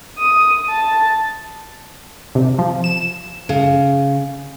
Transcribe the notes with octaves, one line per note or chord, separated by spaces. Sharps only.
D#6
A5
C3
F3
E7
C#3